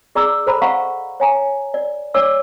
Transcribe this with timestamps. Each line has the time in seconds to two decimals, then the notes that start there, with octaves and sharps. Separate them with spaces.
0.15 G#4 D5 A#5 D6 E6
0.47 A4 C5 A#5 B5
0.62 D#5 F5 F#5 A#5 C#6
1.20 C#5 G#5 A#5
1.74 D5
2.14 D4 C#5 D5 D6 E6